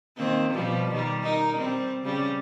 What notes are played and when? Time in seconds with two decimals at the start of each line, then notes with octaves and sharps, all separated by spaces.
0.17 D#3 A#3 C4
0.52 B2 F3 G3
0.91 D#3 G3
1.22 D#4 A#4
1.57 G3 C4
2.03 C#3 G3